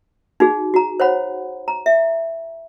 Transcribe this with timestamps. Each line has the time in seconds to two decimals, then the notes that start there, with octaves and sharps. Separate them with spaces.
0.40 D#4 F#4 G#4
0.74 F#4 A#5
1.00 C5 C#5 F#5 B5
1.68 A#5
1.86 E5